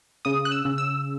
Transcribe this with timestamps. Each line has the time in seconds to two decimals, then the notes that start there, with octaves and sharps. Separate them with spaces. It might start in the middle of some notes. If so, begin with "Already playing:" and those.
0.25 C#3 D#6
0.45 F#6
0.52 E6
0.65 C#3
0.78 E6